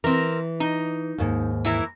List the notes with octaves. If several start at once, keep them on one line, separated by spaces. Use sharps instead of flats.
E3 C4 A#4
D#4
D#2 G#2
E3 E4 A#4